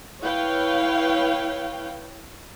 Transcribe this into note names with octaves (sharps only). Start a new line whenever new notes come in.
E4 B4 C#5 F5 G5